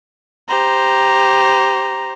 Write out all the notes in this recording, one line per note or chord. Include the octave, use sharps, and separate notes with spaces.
G4 C5 A#5